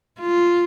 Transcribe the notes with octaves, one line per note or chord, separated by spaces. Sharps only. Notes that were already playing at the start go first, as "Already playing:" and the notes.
F4